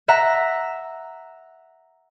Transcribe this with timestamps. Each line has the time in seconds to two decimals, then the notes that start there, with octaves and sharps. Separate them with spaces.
0.08 E5 F#5 A#5